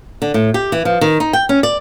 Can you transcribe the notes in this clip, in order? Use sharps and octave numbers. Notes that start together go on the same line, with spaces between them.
D3
A2
G4
E3
F3
D#3
D#4
G5
C#4
D5